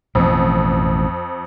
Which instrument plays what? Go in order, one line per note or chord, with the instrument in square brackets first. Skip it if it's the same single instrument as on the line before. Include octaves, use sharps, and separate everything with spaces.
[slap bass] A1 B2 [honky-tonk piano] F2